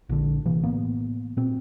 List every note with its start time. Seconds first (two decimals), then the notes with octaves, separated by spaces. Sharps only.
0.09 A#1 D3
0.46 C3 E3 A#3
0.63 A2 A#3 B3
1.37 A#2 C4